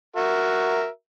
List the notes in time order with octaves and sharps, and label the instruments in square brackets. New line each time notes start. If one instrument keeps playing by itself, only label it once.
[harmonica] F#4 A#4 E5